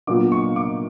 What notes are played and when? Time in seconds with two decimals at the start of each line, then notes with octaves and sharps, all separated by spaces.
0.07 A#2 F#3 B3 D4 D6
0.32 C#6
0.56 D6